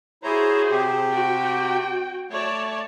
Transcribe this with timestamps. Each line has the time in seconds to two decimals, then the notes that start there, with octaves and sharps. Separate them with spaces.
0.23 E4 F#4 G#4 C5 C#5 A#5
0.70 C3 G4
1.10 F#4 G5
2.31 A3 C#5 D5 A5